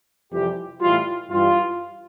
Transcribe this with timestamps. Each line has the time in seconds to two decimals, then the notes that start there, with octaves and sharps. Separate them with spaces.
0.31 F2 C3 E3 G3 G4
0.81 A2 E3 G3 F4
1.30 G2 E3 G3 F4